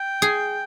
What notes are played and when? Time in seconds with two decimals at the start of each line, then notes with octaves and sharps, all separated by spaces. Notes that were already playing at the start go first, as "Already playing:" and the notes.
Already playing: G5
0.22 G#4